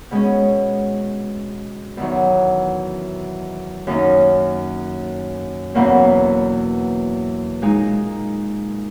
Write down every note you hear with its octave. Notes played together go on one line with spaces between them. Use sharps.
B2 G#3 C#4
E2 D#3 F#3
F#2 D#3 A#3 D#4
E2 B2 F#3 A#3 C#4
A#2 G#3 D#4